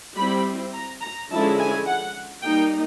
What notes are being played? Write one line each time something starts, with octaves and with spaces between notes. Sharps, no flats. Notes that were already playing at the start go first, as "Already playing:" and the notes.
G3 C4 E4 B5
A#5
A#5
D3 F3 G#3 C#4 E4 A5
G#5
F#5
G3 A#3 D#4 G5